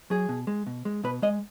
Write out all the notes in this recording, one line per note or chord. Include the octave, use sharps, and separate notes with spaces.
F#3 G#4
B2
G#3
B2
G#3
B2 B4
G#3 D#5